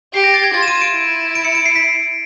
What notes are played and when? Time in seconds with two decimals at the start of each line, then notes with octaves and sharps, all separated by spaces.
0.14 G4 C7
0.24 A#6
0.34 A6
0.44 G#6
0.54 F4 A6
0.63 E7
0.68 D#7
0.82 D7
0.94 E4
1.35 D7
1.45 C#7
1.55 D7
1.66 C7
1.76 B6